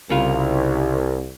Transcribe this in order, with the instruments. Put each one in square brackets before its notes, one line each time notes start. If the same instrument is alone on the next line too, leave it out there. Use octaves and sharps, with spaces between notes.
[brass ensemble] C2 [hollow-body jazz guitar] C#3 F4